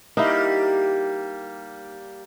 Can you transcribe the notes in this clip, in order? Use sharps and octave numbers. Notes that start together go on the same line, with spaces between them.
G3 A#3 D#4 E4